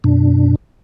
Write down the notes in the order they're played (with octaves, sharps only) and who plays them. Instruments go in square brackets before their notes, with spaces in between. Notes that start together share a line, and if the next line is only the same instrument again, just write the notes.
[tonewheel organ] F#2 B2 D4